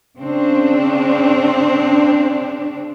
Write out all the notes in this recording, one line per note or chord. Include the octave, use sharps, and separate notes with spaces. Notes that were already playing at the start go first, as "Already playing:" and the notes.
C#3 C4 D4